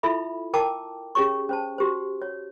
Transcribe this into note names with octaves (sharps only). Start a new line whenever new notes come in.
E4 F4 A4 E5 B5
A#4 G5 A5 A#5 D6
C#4 G4 G#4 C#5 C#6
C#4 C5 A5
F#4 G4 C5
C#5